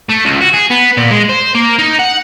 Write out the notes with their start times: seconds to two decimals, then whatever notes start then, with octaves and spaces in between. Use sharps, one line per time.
0.09 A3
0.25 C#2
0.41 F#4
0.54 G#4
0.71 B3
0.97 A#2
1.11 G#3
1.29 C5
1.55 A#3
1.79 D#4
1.99 F#5